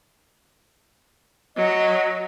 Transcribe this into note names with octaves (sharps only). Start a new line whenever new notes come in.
F#3 D#5